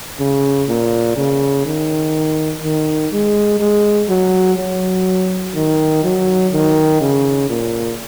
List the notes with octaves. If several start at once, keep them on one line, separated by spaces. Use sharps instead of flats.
C#3
A#2
C#3
D#3
D#3
G#3
G#3
F#3
F#3
D#3
F#3
D#3
C#3
A#2